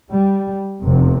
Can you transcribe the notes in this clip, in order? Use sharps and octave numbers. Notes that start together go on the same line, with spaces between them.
G3
F1 E2 C3